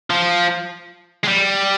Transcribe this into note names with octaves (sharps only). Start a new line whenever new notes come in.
F3
G#3
G3